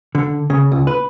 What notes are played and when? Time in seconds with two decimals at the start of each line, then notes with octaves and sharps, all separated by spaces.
0.15 D3
0.50 C#3
0.72 C#2
0.87 B4